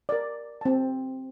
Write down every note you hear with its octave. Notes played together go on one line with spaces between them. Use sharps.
A#4 D5
C4 A5